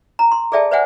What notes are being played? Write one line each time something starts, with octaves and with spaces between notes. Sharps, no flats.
A#5
C6
G#4 A4 D5 E5 G5 A5
B4 C5 D5 E5 F#5 G#5